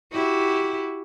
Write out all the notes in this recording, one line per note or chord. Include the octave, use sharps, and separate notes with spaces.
E4 F#4 G4